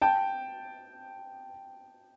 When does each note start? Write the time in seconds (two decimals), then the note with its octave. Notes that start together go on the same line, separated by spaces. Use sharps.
0.02 G5 A5